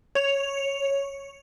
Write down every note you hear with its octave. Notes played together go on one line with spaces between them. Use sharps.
C#5 F7